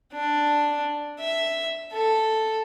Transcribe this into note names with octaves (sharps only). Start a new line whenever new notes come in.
D4
E5
A4